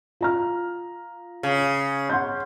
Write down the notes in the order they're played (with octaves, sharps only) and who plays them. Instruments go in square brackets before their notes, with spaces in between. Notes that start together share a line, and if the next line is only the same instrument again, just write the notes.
[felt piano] F4 A#5 F6
[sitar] C#3
[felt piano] F#5 C6 G6